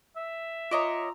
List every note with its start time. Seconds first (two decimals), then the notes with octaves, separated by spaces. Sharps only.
0.16 E5
0.71 F4 C#5 D#5 A#5 D6